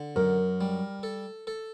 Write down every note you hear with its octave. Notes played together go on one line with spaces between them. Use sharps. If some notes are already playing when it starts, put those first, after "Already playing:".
Already playing: D3
F#2 A#4
G3
A4
A4